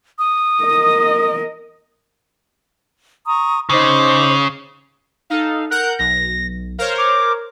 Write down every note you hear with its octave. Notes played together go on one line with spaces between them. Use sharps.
D#6
A#4 D#5
A#5 C#6 D#6
C#3 D#4 C5 D6
D#4 A4 F5
A#4 F#5 F#6 G6
B1 A#6
A#4 C5 C#5 F5
D6